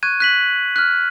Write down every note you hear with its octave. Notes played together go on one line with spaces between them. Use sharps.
C#6 F#6 G#6 D#7
F#6 B6 F#7
F6 F#6